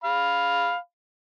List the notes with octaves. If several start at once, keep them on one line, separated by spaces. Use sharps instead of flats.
F5 B5